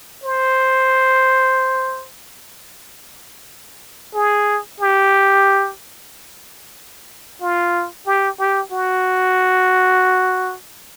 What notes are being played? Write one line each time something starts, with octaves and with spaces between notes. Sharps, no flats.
C5
G#4
G4
F4
G4
G4
F#4